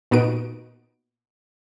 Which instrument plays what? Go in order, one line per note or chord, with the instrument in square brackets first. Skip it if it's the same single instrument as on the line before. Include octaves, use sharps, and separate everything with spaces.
[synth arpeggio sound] A#2 B3 D#4 F#4 D7